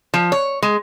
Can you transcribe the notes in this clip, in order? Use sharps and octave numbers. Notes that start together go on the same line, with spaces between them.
F3
C#5
G#3